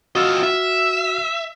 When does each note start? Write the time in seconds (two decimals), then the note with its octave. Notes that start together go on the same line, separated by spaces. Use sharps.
0.15 F4 F#4 D#5 E6 F6
0.43 E5